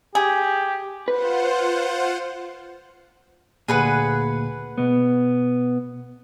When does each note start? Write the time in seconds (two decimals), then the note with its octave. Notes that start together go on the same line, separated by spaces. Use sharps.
0.15 G4 G#4
1.08 F4 B4 C5 F#5
3.68 D2 A#2 G#4 B4 F#5
4.78 B2 B3